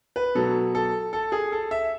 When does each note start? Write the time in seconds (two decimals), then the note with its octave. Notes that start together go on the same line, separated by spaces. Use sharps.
0.16 B4
0.35 B2 F#3 A4
0.75 A4
1.13 A4
1.32 G#4
1.52 A4
1.71 E5